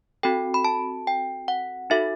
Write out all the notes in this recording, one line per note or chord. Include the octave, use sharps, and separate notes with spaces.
C4 F#4 A4 G5
B5
A5
G5
F#5
D#4 F#4 A4 E5